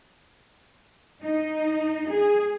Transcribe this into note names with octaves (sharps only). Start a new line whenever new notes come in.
D#4
G#4